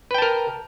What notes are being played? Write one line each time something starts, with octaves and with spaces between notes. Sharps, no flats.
A#4 B4 G5 A5